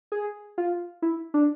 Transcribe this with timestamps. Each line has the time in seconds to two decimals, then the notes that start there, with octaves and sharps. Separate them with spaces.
0.12 G#4
0.58 F4
1.02 E4
1.34 D4